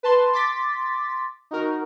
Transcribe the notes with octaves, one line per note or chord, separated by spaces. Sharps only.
B4 A5 C6
C6 D6 A6 B6
D#4 F#4 A#4